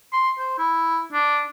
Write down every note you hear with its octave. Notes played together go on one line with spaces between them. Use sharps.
C6
C5
E4
D4